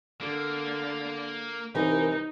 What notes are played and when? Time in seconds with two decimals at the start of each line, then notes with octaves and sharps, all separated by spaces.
0.22 D3 A#3
1.75 C2 E3 D#4 A#4